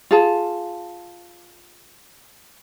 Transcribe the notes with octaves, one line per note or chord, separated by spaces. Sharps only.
F4 G#4 A5